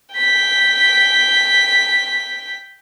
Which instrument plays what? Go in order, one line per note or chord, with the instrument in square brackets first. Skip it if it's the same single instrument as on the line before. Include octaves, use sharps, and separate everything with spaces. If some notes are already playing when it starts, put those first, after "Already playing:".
[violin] G5 B6